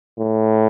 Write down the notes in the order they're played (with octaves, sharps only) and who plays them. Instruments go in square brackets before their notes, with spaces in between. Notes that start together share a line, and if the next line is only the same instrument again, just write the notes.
[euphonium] A2